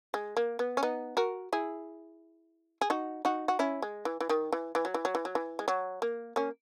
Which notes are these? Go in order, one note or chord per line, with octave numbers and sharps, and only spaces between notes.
G#3
A#3
B3
C#4
B3 D#4
F#4 A#4
E4 G#4
G#4
D#4 F#4
D#4 F#4
F#4
C#4 E4
G#3
E3
E3
D#3
E3
E3
F#3
E3
F#3
E3
F#3
E3
G#3
F#3
A#3
A#3 C#4